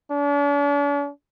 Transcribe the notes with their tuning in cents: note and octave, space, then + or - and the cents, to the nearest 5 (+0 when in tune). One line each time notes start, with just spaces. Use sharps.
D4 -45